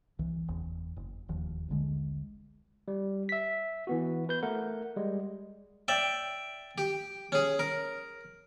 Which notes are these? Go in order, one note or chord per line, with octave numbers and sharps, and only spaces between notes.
C2 E3
F#1 E2
F#1
E1 D#2 F3
D#1 A#1 D3 G#3
G3
E5 B6
E3 B3 F#4
B4 G6
A3 A#4 F#5
G3 G#3
D5 E5 G5
G4
C#4 G#4
A#4